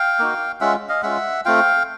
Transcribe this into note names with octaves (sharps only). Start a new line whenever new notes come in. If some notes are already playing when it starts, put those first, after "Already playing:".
Already playing: F5 G5
A#3 D#4 F#4
G#3 C#4 F4 E5 F#5
D#5 F5
G#3 C#4 F4 E5 F#5
A3 C4 F4 F5 G5